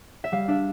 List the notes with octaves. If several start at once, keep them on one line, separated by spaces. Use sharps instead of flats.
E5
G3 F5
D4 E5